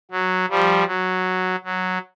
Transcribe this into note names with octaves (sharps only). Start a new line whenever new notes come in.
F#3
F3 G3
F#3
F#3